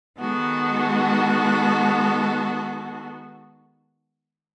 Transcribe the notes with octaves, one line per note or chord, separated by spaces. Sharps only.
D#3 G#3 B3 F#4 A4